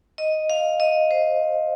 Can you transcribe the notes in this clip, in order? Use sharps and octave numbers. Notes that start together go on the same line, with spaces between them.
D#5
F5
D#5
C5